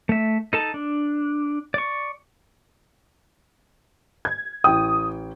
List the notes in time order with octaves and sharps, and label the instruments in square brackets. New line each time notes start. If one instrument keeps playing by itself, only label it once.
[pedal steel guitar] A3 E5
D#4 A4 A5
D4
D5 C#6
[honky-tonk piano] G#6
[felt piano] A1 G5 [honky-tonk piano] D#6